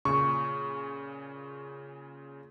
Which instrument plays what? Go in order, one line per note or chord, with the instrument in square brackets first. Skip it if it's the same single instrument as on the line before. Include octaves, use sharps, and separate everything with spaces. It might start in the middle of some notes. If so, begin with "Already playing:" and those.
[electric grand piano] A#2 C#3 [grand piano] C#6